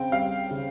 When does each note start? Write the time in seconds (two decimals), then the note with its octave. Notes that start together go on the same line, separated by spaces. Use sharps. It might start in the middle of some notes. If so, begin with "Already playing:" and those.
Already playing: C#3 C4 G5
0.12 G3 F5
0.51 C#3